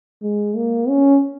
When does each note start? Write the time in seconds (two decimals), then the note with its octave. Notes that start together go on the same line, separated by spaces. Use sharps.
0.22 G#3
0.56 A#3
0.88 C#4